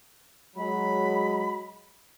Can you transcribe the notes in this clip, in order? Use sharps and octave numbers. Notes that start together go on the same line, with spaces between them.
F#3 G#3 B5